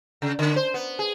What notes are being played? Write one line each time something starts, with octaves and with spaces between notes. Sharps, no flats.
C#3
D3
C5
B3
G#4